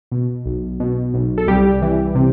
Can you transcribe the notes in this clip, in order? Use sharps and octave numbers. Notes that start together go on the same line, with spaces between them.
B2
B1
B2
B1
A4
C2 G3 G4
E3
C3